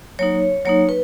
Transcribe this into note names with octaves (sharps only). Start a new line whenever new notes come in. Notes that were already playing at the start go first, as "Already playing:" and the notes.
F#3 A#3 D#4 C#5
F#3 A#3 D#4 C#5
B4